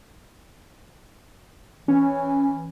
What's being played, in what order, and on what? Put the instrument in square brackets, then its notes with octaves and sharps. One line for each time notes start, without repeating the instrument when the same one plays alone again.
[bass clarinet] E3 [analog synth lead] C#4